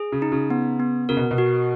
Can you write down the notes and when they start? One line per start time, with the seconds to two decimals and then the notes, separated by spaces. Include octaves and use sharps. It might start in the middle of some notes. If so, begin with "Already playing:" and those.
Already playing: G#4
0.12 C#3
0.22 D#4
0.32 C#3
0.50 B3
0.80 B3
1.09 C#3 A#4
1.17 B2
1.31 B2
1.38 F#4